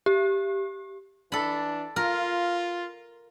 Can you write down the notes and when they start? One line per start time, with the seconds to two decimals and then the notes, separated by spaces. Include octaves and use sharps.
0.06 G4
1.32 E3 D4 A4 B5
1.96 F4 A#4